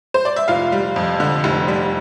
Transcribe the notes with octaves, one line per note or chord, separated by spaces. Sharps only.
C5
D5
E5
F1 F4 F5
G3
F2
D3
F1
G3